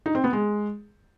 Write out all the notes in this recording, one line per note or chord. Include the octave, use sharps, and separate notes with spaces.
D#4
C4
B3
G#3